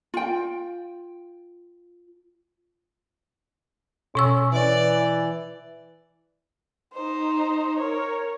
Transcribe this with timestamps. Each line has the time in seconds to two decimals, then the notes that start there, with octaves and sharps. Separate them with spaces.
0.14 F4 G5
4.15 B2 C#4 C#6 E6
4.52 E3 D5
6.94 D#4 C5
7.78 A#4 C#5